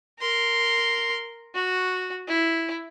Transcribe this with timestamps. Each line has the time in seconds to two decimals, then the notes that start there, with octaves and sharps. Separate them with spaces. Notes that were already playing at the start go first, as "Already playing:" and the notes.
0.19 A#4 C6
1.54 F#4
2.28 E4